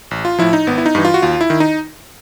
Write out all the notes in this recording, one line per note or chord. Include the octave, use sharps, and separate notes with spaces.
A1
F4
A2 F3 E4
D#4
G#1 B3
E4
D#4
G2 E3
F4
F#4
D#2 F4
E4
D#3
D#4